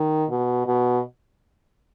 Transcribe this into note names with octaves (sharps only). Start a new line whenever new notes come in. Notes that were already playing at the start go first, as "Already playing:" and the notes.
Already playing: D#3
B2
B2